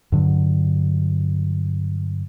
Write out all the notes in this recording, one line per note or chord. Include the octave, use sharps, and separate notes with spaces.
G2 D3 F#3